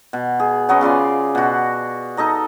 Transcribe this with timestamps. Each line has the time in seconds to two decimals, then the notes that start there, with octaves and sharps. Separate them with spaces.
0.13 B2
0.40 G#4
0.69 F#3 B3 C#4 D#5
0.81 C#3 F4 D5 C6
1.35 B2 F#4
2.17 D#4 A4 D#5 A#5